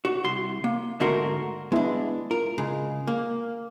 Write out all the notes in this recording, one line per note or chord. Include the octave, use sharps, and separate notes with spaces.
F#4
C2 C6
A#3
D2 G#2 A3 F#4 A#4 C6
G#3 B3 D4 E4 D#5
F4 A#4
C#3 G#3
A#3